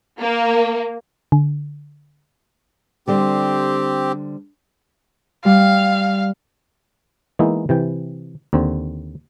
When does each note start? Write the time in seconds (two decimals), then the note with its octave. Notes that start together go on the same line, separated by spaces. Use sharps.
0.20 A#3
1.32 D3
3.08 D3 G3 C4 G4 C5
5.45 G3 F5
7.39 E3 G#3 A#3 B3 D#4 E4
7.69 C3 E3 G5
8.53 D#2 D3 C4